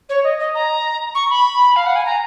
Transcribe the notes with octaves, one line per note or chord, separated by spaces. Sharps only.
C#5
D#5
D#5
A#5
C#6
B5
F5
F#5
G#5
A#5